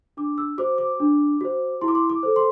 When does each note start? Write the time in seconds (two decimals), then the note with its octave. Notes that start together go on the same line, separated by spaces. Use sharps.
0.17 D4 D6
0.38 E6
0.58 F#4 C5 D6
0.78 D6
1.00 D4
1.41 F#4 C5
1.81 E4 C6
1.88 D6
1.95 C6
2.10 D6
2.23 A4 C5
2.36 C6